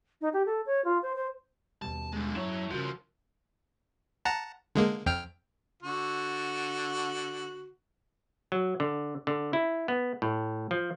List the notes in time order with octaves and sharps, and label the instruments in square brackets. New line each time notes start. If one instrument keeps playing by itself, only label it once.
[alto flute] D#4
G4
A4
C#5
F4
C5
C5
[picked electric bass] D#2 B2 G3 [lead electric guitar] A5
[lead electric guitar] D3 G#3
[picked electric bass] F#2 [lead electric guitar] F#3 [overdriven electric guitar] E4 C#5
[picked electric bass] G2 C#3 [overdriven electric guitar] F3 [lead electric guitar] F#4 A#4
[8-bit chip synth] F#5 A5 A#5
D3 G#3 A#3
F2 G5 F6
[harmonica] D3 F#4
[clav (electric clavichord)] F#3
D3
D3
E4
B3
A2
F3